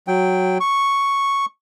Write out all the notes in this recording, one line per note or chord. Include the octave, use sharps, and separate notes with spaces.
F#3 G5
C#6